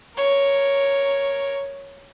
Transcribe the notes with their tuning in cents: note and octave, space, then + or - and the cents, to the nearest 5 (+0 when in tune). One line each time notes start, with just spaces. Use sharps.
A#4 +0 C#5 +0